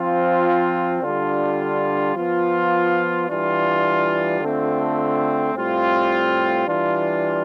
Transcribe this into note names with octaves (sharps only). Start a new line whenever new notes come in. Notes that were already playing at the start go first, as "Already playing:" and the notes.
Already playing: F3 C4 F4
D3 G3 D4 F4
F3 B3 F4
E3 G3 D4 F4
D3 A3 C4 F4
A2 G3 C4 F4
E3 G3 D4 F4